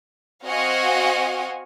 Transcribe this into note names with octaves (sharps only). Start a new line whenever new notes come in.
C4 F#4 D#5 F5 F#5 G#5